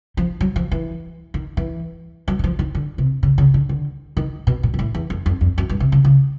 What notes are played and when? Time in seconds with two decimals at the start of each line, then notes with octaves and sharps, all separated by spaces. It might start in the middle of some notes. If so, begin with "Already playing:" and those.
0.17 F3
0.41 F#3
0.56 F3
0.71 E3
1.34 D#3
1.57 E3
2.28 F#3
2.39 F#3
2.44 F3
2.59 D#3
2.75 D3
2.98 C3
3.23 C#3
3.38 C#3
3.54 D3
3.69 D3
4.17 D#3
4.47 B2
4.63 A#2
4.74 A#2
4.79 A2
4.95 E2
5.10 F2
5.26 F2
5.41 F2
5.58 F#2
5.69 G2
5.80 C3
5.92 C#3
6.05 C#3